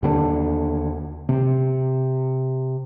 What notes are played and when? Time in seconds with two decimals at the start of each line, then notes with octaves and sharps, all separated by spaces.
0.03 D#2 D3 A3 D4
1.29 C3